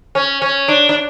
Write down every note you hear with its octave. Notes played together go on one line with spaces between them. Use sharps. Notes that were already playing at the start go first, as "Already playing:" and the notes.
C#4
C#4
D4
D4